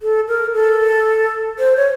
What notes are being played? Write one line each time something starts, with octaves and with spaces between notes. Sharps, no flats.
A4
A#4
A4
C5
C#5